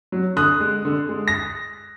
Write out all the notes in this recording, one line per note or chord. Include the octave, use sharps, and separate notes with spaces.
F#3
D3 D#6 F#6
G#3
D3
G#3
A#6